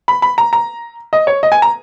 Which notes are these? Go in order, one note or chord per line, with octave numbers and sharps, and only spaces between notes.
B5
B5
A#5
A#5
D#5
C#5
D#5
G#5
A#5